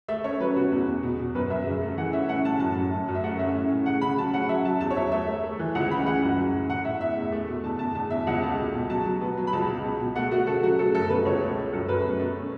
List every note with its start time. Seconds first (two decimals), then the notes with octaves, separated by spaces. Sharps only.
0.08 A3 E5
0.24 C#4 C#5
0.40 F#3 B4
0.56 B2 F#4
0.72 E2
0.88 E2
1.03 B2
1.19 B2
1.35 F#2 B4
1.50 F#2 E5
1.66 C#3
1.82 A3
1.97 E3 F#5
2.13 C#4 E5
2.29 A2 F#5
2.45 A2 A5
2.60 F#2 A5
2.76 F#2
2.91 F#2
3.08 F#2
3.15 E5
3.24 A3 F#5
3.39 C#4 E5
3.55 A2
3.71 A2
3.86 C#3 F#5
4.01 C#3 B5
4.18 F#3 A5
4.33 C#4 F#5
4.49 F#3 E5
4.65 F#3 A5
4.81 E2 A5
4.91 C#5
4.96 F#3 E5
5.12 A3 E5
5.28 A3
5.44 A3
5.59 E3
5.75 C#2 F#5
5.90 C#4 B5
6.06 E3 F#5
6.23 F#2
6.37 F#3
6.54 A2
6.69 A2 F#5
6.85 A2 E5
7.01 E2 E5
7.17 E2
7.32 A3
7.48 B2
7.63 E2 A5
7.79 E2 A5
7.95 E2 A5
8.10 E2 E5
8.27 C#2 F#5
8.42 A3 A5
8.58 B2
8.74 B2
8.90 F#3 A5
9.06 F#3
9.21 B3
9.37 F#3
9.47 B5
9.53 C#2 A5
9.68 B2
9.84 B2
10.00 B2
10.16 A3 F#5
10.31 A3 F#4
10.47 C#3 A4
10.63 F#3 F#4
10.79 C#3 A4
10.95 F#2 A4
11.09 B2 B4
11.25 C#2 C#5
11.42 A3
11.57 A3
11.73 F#2 A4
11.89 F#2 B4
12.04 B2
12.20 A3
12.36 C#4